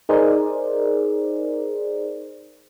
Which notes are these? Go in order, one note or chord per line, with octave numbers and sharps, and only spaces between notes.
D#4 G#4 A#4 C5 D5